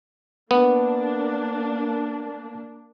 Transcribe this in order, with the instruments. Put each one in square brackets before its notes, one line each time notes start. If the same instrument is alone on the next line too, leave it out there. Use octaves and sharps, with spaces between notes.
[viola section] A#3 D4 [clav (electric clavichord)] B3